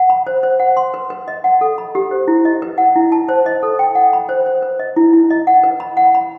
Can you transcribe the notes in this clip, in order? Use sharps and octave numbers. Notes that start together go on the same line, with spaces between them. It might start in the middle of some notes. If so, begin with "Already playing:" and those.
Already playing: F#5
B5
C5
C5
F#5
C6
B4
B4
D#5
F#5
A4
B5
G4
C5
E4
D#5
B4
F#5
E4
A5
C5
D#5
A4
G5
F#5
B5
C5
C5
B4
D#5
E4
E4
D#5
F#5
B4
B5
F#5
B5